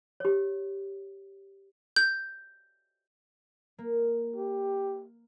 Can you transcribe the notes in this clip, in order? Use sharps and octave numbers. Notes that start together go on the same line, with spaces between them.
G4 C#5
G6
A#3
G4